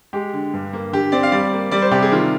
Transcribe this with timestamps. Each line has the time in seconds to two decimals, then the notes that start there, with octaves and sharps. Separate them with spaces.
0.13 G#3 G4
0.33 D3
0.53 G2
0.73 A#3
0.92 D3 G4
1.12 C4 D5
1.23 F5
1.32 G3 D5
1.53 A#3
1.71 G3 D5
1.82 C5
1.91 C3 G4
2.02 G#4
2.11 D#3 F4